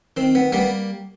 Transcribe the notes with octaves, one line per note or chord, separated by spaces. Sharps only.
D#3 C4
B3
G3 A#3 B3